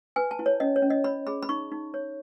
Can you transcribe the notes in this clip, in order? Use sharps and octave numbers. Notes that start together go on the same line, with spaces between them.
B4 G#5
A5
E4
C#5
C#4 D#5
C#5
C#4
D#5
C#5 B5
G#4 B5
B5
D#4 C#6
D#4
C#5